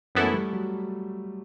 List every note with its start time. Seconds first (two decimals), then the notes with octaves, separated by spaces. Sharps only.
0.15 F#2 E3 B3 E4 A4
0.23 A3
0.34 G3
0.53 F#3